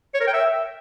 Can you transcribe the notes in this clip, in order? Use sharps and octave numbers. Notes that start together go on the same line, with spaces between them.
C#5
A#4
G5
E5